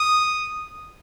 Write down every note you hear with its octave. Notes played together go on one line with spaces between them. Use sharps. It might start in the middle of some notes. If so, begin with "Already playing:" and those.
Already playing: D#6